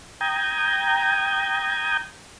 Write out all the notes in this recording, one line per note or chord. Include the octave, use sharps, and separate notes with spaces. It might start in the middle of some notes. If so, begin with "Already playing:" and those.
G5 A#5 D#6 G6 G#6